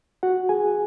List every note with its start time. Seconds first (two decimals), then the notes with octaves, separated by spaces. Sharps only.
0.23 F#4 F#5
0.49 G#4 G#5